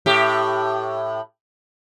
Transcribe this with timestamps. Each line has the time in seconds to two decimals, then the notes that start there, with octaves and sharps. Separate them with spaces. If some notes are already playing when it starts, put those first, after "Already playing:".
0.06 A2 G4